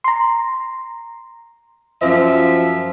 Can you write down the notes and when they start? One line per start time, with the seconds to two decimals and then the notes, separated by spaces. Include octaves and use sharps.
0.04 A#5 C6
2.02 F#2 F3 E5